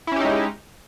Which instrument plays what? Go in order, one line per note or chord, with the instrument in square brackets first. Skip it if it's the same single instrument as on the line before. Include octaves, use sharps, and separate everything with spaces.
[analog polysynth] E4
C#4
G4
D#4
G#3